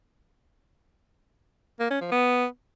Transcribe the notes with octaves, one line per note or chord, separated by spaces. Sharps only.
A#3
C#4
F3
B3